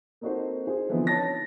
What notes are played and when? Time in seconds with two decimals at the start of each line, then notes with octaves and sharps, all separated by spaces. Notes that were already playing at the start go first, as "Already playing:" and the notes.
0.21 A#3 C4 D#4 F#4 A4 C5
0.67 G#4 C5
0.89 D3 E3 F3 B3 C4 D#4
1.07 C#5 A5 A6 A#6